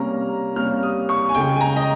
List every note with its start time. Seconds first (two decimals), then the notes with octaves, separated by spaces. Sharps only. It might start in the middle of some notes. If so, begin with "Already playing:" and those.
Already playing: C3 G3 A#3 C#4 A#5
0.56 C3 G3 A#3 C#4 F6
0.83 D#6
1.09 C#6
1.29 G#5
1.34 C#2 C#3 G#3 G5
1.56 G#5
1.61 A#5
1.76 D#5